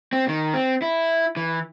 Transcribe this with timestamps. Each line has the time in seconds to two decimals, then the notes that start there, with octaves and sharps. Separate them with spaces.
0.13 C4
0.28 D#3
0.54 C4
0.82 E4
1.36 E3